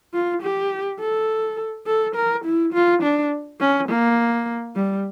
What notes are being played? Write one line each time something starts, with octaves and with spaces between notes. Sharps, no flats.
F4
G4
A4
A4
A#4
E4
F4
D4
C#4
A#3
G3